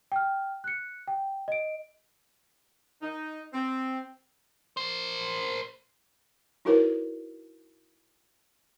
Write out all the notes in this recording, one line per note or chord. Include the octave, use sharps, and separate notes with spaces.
G5 F6
F#6 C#7
G5
D#5 D7
D#4
C4
A#4 C5
D#4 E4 F#4 A#4 B4 C#5